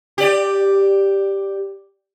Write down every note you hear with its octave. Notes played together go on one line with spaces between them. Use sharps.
G4 D5